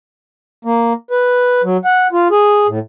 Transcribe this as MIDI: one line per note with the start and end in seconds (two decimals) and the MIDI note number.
0.65 0.93 58
1.11 1.62 71
1.64 1.77 54
1.85 2.07 78
2.13 2.28 65
2.31 2.67 68
2.68 2.79 45